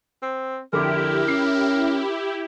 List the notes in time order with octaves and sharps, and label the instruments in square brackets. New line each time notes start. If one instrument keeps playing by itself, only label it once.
[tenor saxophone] C4
[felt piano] F2 D3 D6 [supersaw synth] E4 G4 [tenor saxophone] A#4
[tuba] C#4 [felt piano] C7